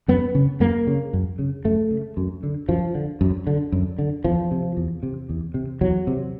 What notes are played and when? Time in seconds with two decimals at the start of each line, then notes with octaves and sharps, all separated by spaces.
0.08 F#2 B3
0.35 C#3
0.60 F#2 A#3
0.87 C#3
1.13 F#2
1.39 C#3
1.65 F#2 A3
1.91 C#3
2.17 F#2
2.43 D3
2.68 F#2 F3
2.95 D3
3.21 F#2
3.47 D3
3.72 F#2
3.99 D3
4.24 E2 F3
4.51 C3
4.77 E2
5.03 C3
5.29 E2
5.54 C3
5.81 E2 F#3
6.07 C3